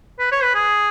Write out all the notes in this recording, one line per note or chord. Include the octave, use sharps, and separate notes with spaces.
B4
C#5
B4
G#4